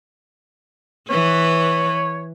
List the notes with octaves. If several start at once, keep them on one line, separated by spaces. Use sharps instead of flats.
E3 B4 C#5